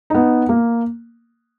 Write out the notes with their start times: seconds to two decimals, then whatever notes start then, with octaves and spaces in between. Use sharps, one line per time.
0.10 B3 D#4
0.49 A#3